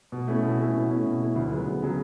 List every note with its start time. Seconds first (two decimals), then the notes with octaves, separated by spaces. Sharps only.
0.12 B2
0.27 A3 C#4 E4
0.43 B2
0.59 A3 C#4 E4
0.74 B2
0.89 A3 C#4 E4
1.06 B2
1.21 A3 C#4 E4
1.36 D2
1.51 C#3 F#3 B3
1.66 D2
1.82 C#3 F#3 B3